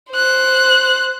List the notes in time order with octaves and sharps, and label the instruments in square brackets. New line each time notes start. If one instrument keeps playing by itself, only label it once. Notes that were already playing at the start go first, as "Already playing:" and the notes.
[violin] C5 F#6